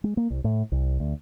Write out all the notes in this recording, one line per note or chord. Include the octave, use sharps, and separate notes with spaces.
G#3
A#3
C2
A2
C2
D2